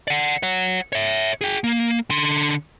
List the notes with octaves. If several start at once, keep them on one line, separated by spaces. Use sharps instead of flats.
D5 F#5
C#5 F#5
C#5 E5
G#4 G5
A#3
D3 C6